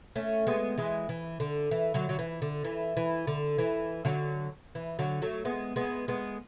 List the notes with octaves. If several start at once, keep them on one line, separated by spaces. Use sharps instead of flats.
A3 C#4
G#3 B3
E3 G#3
E3
D3
E3
D3 F#3
F#3
E3
D3
E3
E3
D3
E3
D3 F#3
E3
D3 F#3
F#3 A3
G#3 B3
G#3 B3
G#3 B3